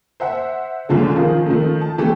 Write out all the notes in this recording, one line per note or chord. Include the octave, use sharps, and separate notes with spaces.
C5 E5 F#5
C2 F#2 D3 F3 G#3
D#3 F3 F4 G#4 A#4
D#3 F3 A3
A5
E3 A3 G4